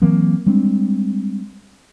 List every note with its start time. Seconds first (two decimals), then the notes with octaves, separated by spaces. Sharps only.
0.02 E3 F#3 A#3 C4
0.46 G3 G#3 C4 D4